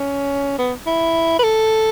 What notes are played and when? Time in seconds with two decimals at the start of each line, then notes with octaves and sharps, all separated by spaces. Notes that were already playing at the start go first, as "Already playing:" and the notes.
Already playing: C#4
0.59 B3
0.87 E4
1.39 B4
1.44 A4